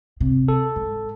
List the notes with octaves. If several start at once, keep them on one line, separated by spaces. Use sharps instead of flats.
C3
A4
G#2